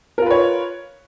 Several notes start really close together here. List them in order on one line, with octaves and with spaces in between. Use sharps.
A#4 F4 B4 C#5